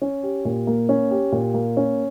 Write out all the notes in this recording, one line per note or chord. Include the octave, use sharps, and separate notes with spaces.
C#4
G4
A#2
A#3
C#4
G4
A#2
A#3
C#4